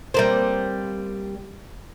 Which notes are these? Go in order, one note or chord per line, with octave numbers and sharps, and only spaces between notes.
G3 A#3 C4